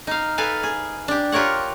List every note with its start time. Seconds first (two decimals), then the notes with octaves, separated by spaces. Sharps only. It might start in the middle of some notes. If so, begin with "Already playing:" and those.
0.07 D#4 F5
0.38 A4 B4 D#5 F5 G#5
0.63 G#4
1.08 D4 G4
1.32 F4 G4 A#4 C#5 F#5